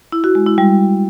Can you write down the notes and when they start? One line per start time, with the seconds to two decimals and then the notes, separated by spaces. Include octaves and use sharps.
0.12 E4
0.24 F#4
0.35 G#3
0.47 E4
0.58 G3